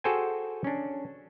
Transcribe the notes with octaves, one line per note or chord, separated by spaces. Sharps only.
F#4 G#4 A4 C5 G5 G#5
C#4 D4